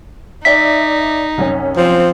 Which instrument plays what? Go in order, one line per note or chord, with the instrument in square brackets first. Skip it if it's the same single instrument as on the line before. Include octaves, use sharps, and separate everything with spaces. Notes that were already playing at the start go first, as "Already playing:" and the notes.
[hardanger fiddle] D#4 [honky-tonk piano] D5 E5 [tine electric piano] B6
[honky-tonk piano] C2 F#2 C#4
[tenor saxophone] F3 [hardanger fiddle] C4